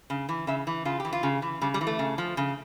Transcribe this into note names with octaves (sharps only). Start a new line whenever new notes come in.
C#3
E3
C#3 E5
E3
C#3 F4
E3 G4
F4
C#3
E3
C#3 G3
G3
E3
A3
C#3
F3
C#3